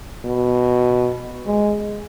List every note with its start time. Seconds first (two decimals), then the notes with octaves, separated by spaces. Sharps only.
0.25 B2
1.46 G#3